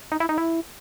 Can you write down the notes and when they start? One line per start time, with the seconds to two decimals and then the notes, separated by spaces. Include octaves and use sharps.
0.12 D#4
0.20 E4
0.29 D#4
0.38 E4